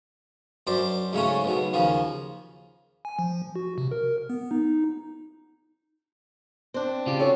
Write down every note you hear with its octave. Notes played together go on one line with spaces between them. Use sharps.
F#2 D4 C5 D6
G#2 C#3 A3 C#4
B1 B2
D#2 C#3 F3
G#5
F3
F#4
C3
A#4
B3
D#4
C4 D4
C#3 F4 G4
F#4 A4 C#5